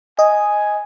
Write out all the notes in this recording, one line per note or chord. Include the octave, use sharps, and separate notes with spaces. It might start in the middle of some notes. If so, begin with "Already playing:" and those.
D#5 G#5